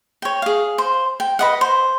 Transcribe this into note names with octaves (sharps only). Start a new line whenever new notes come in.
C#5 G5
G#4 F5
C5
G5
B4 D#5 F#5
C5